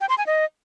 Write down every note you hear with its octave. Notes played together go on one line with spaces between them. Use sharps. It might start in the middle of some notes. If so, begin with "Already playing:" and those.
G5
C6
G#5
D#5